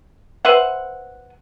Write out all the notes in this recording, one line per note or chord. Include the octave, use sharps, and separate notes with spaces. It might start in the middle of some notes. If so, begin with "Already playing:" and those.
B4 C5 E5 F#5